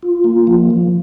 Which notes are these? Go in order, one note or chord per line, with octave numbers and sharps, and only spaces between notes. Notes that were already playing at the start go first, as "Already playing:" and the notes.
F4
A#3
F3
F3